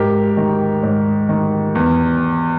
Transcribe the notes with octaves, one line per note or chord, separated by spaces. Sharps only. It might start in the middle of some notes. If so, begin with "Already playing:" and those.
Already playing: G#2 G4 A#4
D#3
G#2
D#3
E2